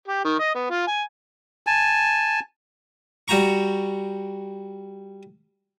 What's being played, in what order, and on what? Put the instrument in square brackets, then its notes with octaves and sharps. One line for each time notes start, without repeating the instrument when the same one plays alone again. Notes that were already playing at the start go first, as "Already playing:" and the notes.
[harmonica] G4
D#3
D#5
B3
F4
G#5
[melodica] G#5 A5
[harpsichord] G3 F#4 G5 A#5 C#6